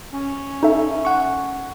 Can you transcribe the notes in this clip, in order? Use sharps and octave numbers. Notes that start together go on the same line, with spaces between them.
C#4
D#4 A4 E5
F#5 C#6